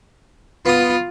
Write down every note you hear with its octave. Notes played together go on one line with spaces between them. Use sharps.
B3 F4 D#6